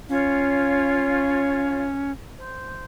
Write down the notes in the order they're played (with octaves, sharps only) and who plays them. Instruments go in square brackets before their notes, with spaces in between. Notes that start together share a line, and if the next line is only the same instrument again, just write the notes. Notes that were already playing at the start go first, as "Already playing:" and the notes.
[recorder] C#4 [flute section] F4 C#5 F5
[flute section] C5